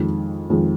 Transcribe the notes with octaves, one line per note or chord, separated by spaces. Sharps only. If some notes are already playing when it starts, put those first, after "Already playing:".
Already playing: F2 D#3 G#3
F2 D#3 G#3